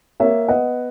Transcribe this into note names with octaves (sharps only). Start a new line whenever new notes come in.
A#3 C#5 E5
B3 D#5 F#5